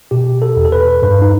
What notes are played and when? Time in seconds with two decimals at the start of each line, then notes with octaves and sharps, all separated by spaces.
0.11 B2 G4
0.42 A4
0.57 E2
0.65 A4
0.72 B4
1.02 G2 B4
1.22 D#4